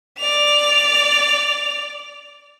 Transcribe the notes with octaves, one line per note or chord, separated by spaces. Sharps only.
D5 F7